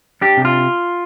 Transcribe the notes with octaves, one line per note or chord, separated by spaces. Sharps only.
D4 G4
C3
F4